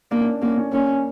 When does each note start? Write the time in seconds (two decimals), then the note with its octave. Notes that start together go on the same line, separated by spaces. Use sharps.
0.11 A#3 D4
0.21 C#4
0.26 D4
0.42 A#3 C#4
0.58 C#4
0.72 A#3 C#4